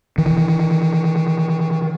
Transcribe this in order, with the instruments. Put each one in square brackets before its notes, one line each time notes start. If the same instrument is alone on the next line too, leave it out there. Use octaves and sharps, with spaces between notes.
[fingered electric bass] D#3 E3